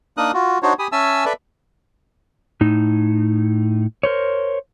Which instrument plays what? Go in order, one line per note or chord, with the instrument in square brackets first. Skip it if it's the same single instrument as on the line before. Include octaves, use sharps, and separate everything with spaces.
[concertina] A#3 D4 D#4 A#4 D#6 F#6
F4 F#4
D4 D#4 F#4 C5 C#5
G4 G#5 B5 D#6
C#4 E5 G#5 A5 E6
A4 B4 D5 E5
[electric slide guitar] A2 D#4
A#4 C5 C#5